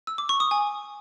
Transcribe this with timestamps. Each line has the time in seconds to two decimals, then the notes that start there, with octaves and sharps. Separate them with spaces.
0.07 E6
0.18 D6
0.29 C#6
0.40 D#6
0.51 G#5